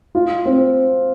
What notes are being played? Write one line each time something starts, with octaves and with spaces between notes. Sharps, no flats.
F4
C4